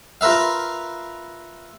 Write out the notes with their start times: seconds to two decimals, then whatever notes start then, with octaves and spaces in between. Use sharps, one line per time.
0.21 F4 A#4 B4 E5 F5